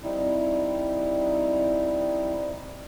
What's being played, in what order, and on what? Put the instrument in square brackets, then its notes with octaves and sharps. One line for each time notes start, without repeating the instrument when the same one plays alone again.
[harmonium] G3 C4 D#4 E4